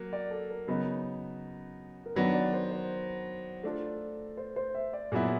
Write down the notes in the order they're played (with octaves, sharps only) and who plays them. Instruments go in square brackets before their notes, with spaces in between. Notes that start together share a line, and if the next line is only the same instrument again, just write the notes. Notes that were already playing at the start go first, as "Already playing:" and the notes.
Already playing: [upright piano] F#3 A#3
[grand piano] D5
A4
A#4
[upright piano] C#3 F#3 B3 D#4
[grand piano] A#4
[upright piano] D#3 F#3 B3 D4 [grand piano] B4
[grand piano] D5
C5
C5
[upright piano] A3 D4 F4 A4
[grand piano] C5
C5
E5
D5
[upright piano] A#2 F#3 B3 E4 [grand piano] G#4